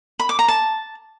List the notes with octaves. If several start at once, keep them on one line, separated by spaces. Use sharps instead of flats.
B5
D6
A#5
A5